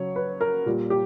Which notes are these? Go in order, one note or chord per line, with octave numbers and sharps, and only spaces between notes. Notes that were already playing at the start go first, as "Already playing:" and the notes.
Already playing: C#3 F#3 C#5
B4
A#4
A#2 G3
G4